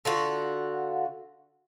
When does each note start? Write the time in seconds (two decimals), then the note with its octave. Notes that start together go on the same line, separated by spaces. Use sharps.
0.05 D3 F4 F#4